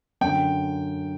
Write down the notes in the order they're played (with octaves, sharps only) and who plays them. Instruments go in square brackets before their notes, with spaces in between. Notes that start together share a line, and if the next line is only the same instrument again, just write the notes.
[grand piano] F#2 D3 G5